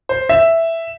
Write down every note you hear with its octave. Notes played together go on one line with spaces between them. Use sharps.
C5
E5